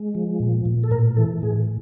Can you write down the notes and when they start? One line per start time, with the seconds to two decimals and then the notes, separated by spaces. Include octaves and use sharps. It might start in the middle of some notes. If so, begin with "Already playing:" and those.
Already playing: G#3
0.15 F3
0.40 A#2
0.65 A#2
0.84 A4
0.91 A2 A#4
1.17 E3 A4
1.42 A2 G#4